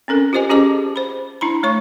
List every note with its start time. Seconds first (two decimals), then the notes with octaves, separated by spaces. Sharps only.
0.08 C4 C#4 A4 A#4
0.33 F4 G4 C5 D#5 G#5
0.49 C#4 G4 G#4 D#5 A5 D6
0.96 C5 B5
1.41 D4 E4 A#5 B5
1.63 A3 C#5 C#6